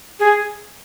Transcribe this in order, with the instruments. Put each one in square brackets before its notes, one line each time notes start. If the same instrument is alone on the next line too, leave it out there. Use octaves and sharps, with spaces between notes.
[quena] G#4